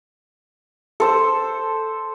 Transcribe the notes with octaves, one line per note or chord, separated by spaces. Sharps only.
A4 C5 E6